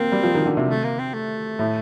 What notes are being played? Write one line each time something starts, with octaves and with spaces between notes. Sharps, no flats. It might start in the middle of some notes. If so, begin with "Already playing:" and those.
Already playing: A#3 C4
G3
F3
D#3
D3
C3
A3
A#3
C4
A3
A2